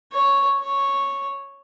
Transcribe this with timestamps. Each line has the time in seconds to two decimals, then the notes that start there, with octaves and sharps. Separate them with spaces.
0.12 C#5
0.59 C#5